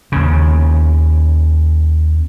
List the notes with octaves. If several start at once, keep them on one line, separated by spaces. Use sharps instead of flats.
D#2 C#3